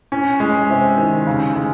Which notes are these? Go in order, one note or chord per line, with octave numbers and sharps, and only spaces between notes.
C#4
G#3
C3
D#3
C#3
G#3